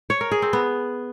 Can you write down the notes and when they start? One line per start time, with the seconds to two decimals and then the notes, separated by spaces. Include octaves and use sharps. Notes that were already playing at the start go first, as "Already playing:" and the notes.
0.10 C#5
0.21 A#4
0.31 G#4
0.42 C4
0.53 B3